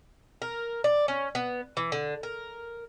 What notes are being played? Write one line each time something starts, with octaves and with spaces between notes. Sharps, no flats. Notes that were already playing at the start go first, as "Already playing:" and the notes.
A#4
D5
C#4
B3
E3
D3
A#4